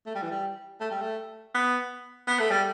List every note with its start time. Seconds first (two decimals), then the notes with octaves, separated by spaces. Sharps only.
0.06 A3
0.15 G3
0.22 E3
0.31 G3
0.81 A3
0.91 G3
1.01 A3
1.54 B3
2.27 B3
2.39 A3
2.51 G3